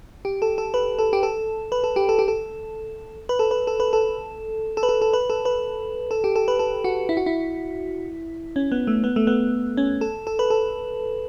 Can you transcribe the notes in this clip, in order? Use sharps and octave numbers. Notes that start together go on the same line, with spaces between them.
G4
A4
A4
B4
A4
G4
A4
B4
A4
G4
A4
G4
A4
B4
A4
B4
A4
B4
A4
A4
B4
A4
A4
B4
A4
B4
A4
G4
A4
B4
A4
F#4
E4
F#4
E4
C#4
B3
A3
B3
A3
B3
C#4
A4
A4
B4
A4